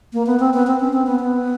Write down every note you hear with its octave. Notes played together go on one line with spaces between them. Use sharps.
A#3
B3
C4
B3
C4
C#4
C4
B3
B3